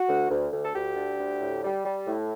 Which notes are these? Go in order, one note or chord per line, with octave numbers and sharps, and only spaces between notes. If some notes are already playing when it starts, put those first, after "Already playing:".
Already playing: F#4
D2
D2
D2
A4
D2 G4
D3
D2
A2
G3
G3
A2